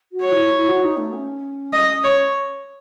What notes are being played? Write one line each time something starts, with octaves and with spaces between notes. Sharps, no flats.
F#4
C#5
E4
E4
F#4
D#4
A3
C#4
D#5
C#5